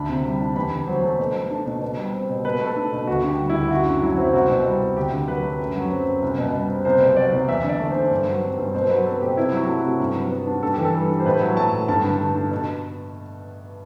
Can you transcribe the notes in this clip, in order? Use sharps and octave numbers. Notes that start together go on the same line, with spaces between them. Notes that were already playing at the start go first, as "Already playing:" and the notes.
Already playing: D2 D4 B5
C3
G3
D4
E2 B5
D3
F#3 C5
A3
B2
A3
D4
B2
B2
G3
C4
B2
B2 B4
A3
A4
D4
B2
D2 F#4
D3 G4
G3
E4
D2
F#2 F#4
D3
F#3 E4
F#4
C4
E4
C2 F#4
B2
G3
C2
D2 G4
D3
F#3 B4
A3
F#2
F#3
C4
F#2
C2
B2
G3
C4
C2 C5
B2
F#3 D5
C2
E2 E5
D3 D5
A3
C5
D4
G2
F#3
C4
G2
B2 C5
F#3 B4
C4 A4
B2 G4
C3 E4
F#3 F#4
A3
F#4
C3
G2
F#3
B3
D4
G2 A4
E3 G4
A4
G3
D4
C5
A2 B4
F#3
A3 A5
A2
G2 A5
D3
A3
D4
B2